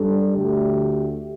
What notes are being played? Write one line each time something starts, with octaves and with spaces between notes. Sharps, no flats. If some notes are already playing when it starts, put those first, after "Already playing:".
Already playing: G2 G3 D4 A4
D2 D3 A3 G4